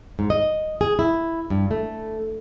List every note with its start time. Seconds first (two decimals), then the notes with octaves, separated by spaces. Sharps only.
0.19 G#2
0.30 D#5
0.81 G#4
0.99 E4
1.50 G2
1.71 A3